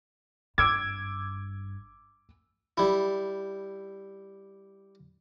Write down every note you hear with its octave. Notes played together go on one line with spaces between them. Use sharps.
G#1 G2 D6 E6 G#6 D7
G3 E4